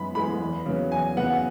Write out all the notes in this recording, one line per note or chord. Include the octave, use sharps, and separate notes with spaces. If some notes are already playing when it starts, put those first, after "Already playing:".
Already playing: F#2 E3 G#3 B3 B5
E3 G#3 B3 B5
E2
C#3 F#3 B3
E2 G#5
C#3 F#3 B3 F#5